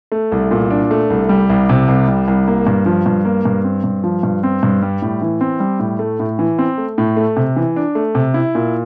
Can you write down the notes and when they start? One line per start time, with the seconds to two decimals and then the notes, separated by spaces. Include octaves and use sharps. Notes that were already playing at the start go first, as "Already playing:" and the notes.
0.12 A3
0.32 C2
0.51 A#2
0.70 D4
0.91 A3
1.10 C2
1.29 G3
1.50 C2
1.69 C3
1.88 C2
2.08 G3
2.28 C2
2.48 A#3
2.67 G2
2.86 F3
3.06 G2
3.25 A#3
3.45 G2
3.64 C4
3.84 G2
4.04 F3
4.23 G2
4.43 C4
4.63 G2
4.82 G3
5.02 A2
5.21 E3
5.41 C4
5.60 G3
5.79 A2
5.99 A3
6.19 A2
6.39 E3
6.59 C4
6.78 A3
6.98 A2
7.17 A3
7.36 C3
7.56 E3
7.76 D4
7.95 A3
8.15 C3
8.34 E4
8.55 A#2